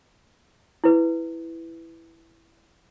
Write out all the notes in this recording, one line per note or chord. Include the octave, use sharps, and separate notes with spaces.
E4 B4